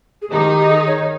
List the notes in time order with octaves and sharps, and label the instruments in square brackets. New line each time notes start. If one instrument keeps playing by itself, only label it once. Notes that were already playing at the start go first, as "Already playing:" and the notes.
[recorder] G#4
[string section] D#3 D#4 [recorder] G4
[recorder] G4
G#4
C#5